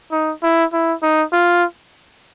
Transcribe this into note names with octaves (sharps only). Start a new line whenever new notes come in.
D#4
E4
E4
D#4
F4